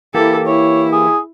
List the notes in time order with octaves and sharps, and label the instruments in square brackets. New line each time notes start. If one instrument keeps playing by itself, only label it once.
[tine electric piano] E3 A#3 G4 [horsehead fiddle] E4 A4
[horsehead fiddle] E4 [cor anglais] C#5
[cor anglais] G#4